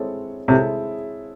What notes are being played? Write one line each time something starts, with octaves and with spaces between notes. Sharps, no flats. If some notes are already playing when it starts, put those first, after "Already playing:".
Already playing: G#3 C4 E4 A4 C#5
C3 G#3 C4 E4 A4 C#5